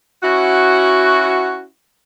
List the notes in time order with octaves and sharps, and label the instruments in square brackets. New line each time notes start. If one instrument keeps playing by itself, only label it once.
[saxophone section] C#4 E4 F#4